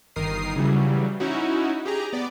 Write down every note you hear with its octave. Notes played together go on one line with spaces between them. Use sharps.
G1 D#3 A#4 D#6 C7
C#3 E3 F#3 G3
C#4 D#4 E4 F#4
G4 G#4 A#5
B3 D5